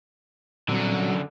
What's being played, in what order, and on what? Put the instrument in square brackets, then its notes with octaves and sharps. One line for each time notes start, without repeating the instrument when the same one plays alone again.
[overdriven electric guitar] F#2 D3 [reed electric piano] A#2 G3 C4 [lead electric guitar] F#3